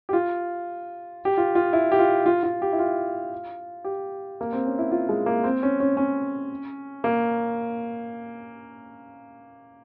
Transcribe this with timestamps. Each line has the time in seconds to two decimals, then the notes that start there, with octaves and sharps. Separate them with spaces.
0.09 G4
0.13 F4
1.25 G4
1.37 F4
1.55 F4
1.73 E4
1.92 G4
1.99 F4
2.26 F4
2.43 F4
2.62 G4
2.73 E4
2.79 F4
3.85 G4
4.41 A#3
4.53 C4
4.66 C#4
4.78 E4
4.92 F4
5.09 G#3
5.26 A#3
5.44 C4
5.63 C#4
5.80 C#4
5.97 C#4
7.04 A#3